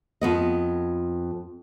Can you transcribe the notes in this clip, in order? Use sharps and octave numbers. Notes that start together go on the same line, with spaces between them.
F2 B3 D#5